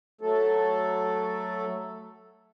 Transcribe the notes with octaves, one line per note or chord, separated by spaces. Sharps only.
F#3 A3 A4